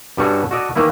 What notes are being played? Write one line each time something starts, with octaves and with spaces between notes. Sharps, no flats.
G2 G3 C#4 F#4 A4
F#4 A4 D5 D#5
D#3 E3 A#3 E4